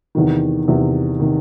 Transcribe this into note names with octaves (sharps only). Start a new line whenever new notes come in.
E2 C3 D#3
E2 C3 D#3
C3 D#3